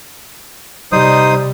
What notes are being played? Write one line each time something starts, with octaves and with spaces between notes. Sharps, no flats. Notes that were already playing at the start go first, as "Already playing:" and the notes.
C3 G3 D#4 C5 D#6